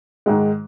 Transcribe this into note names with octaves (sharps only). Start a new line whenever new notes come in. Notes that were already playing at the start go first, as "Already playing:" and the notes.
G#2 D#3 G#3